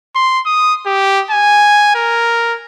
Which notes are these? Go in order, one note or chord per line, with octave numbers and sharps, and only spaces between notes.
C6
D#6
G4
G#5
A#4